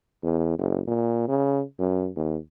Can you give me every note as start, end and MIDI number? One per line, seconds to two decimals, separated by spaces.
0.24 0.58 40
0.58 0.81 30
0.87 1.27 46
1.28 1.63 49
1.79 2.09 42
2.16 2.37 39